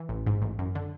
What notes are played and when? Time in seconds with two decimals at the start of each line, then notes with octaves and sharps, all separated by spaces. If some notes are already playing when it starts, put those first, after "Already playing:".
Already playing: E3
0.09 A1
0.27 G#2
0.42 A1
0.59 F#2
0.75 D3